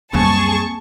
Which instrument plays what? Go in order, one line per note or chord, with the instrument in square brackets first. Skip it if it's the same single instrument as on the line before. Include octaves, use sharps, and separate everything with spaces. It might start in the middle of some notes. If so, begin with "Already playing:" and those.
[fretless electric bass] C#2 F#2 G3 [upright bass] A#3 C4 [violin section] G#4 A5 C#6